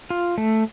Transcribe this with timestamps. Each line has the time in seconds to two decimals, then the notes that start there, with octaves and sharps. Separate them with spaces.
0.10 F4
0.38 A3